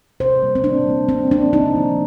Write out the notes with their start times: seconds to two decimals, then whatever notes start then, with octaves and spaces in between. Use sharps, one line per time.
0.20 C3 C5
0.43 G3 A#3
0.55 C4
0.64 C3 D4
0.87 G3 A#3
1.08 C3 C4
1.30 F3 A#3 D4
1.53 C3 D#4
1.76 F3 A#3